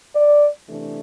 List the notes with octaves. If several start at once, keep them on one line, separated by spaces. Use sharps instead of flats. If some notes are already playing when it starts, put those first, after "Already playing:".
D5
C3 E3 A3 D4